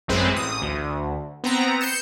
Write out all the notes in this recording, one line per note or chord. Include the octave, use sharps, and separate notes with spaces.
A1 F#2 G#3 C4 B4 C5
A1 D#6
D2
B3 C4 A#5
G6 C7 C#7 E7